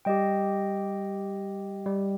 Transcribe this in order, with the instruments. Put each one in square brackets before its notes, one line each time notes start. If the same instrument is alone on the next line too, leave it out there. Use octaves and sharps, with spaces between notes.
[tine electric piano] G3 [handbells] G4 D#5 G5
[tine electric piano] G3